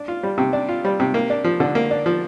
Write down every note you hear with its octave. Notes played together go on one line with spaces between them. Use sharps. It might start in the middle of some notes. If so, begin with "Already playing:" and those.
Already playing: D4
F4
G3
C3
D4
F4
G3
C3
A#3
D4
F3
D3
A#3
D4
F3